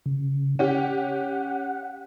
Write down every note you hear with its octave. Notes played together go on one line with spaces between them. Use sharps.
C#3
C#4 G4 F#5